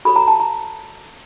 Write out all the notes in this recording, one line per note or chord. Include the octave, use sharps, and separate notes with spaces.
F#4 A4 C#5 B5
A#5
A5
A#5